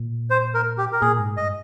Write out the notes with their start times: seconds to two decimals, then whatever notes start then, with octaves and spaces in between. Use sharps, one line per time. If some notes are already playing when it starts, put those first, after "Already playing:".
Already playing: A#2
0.30 C5
0.54 A#4
0.78 G4
0.92 A#4
1.01 A#2 G#4
1.19 G#2
1.37 G2 D#5